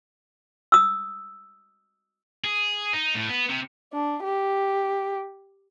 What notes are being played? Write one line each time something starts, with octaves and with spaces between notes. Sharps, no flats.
D#6 E6
G#4
D#4
A2
B3
C3
D4
G4